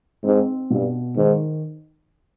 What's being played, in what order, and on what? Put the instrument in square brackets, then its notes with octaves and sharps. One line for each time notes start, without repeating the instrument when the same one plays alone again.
[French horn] G#2 [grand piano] C4
[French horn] G2 [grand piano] B2
[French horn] G#2 [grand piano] D#3